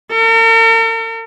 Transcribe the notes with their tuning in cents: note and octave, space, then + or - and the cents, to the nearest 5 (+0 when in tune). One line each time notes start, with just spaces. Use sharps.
A#4 -45